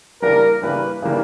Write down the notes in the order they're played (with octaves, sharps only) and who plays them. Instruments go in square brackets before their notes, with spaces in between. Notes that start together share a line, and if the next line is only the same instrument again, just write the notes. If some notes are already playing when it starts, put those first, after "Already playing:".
[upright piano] C#3 E3 G3 A#3 D4 [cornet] A#4
[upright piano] C#3 E3 G3 A#3 D4 [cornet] B4
[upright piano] C#3 E3 G3 A#3 D4